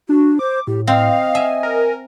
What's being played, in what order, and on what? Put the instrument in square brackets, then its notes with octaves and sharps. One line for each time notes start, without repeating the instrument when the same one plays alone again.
[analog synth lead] D4 [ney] F#4
[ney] C5 [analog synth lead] D6
[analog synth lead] A2 [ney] G4
[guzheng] C4 [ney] D#5 [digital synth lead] F5
[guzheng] E5 [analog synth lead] G#5
[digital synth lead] A#4